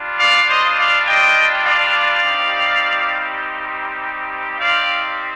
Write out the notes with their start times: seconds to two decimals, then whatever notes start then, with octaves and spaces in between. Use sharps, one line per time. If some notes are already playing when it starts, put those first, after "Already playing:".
Already playing: G3 D4 F4
0.18 D5 F5
0.48 C5 D#5
0.77 D5 F5
1.07 D#5 G5
1.66 D5 F5
2.24 G3 C4 D#4 G4
4.59 C4 D#4 G4 D5 F5